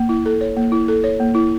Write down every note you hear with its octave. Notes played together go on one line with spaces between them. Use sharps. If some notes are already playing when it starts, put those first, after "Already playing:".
Already playing: A#3
E4
A4
C#5
A#3
E4
A4
C#5
A#3
E4